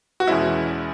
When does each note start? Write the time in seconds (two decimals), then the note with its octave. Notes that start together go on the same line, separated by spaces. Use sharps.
0.20 F#4
0.27 E2 B2 G#3 C#4 E4